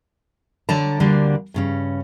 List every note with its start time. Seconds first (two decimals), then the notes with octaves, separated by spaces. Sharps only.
0.69 D3 F#3 D5 A5 A#5
1.00 D2 D3 G3 A#3 D4
1.54 G2 C#3 C#4